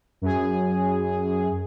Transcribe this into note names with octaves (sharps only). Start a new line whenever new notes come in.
F#2 G#4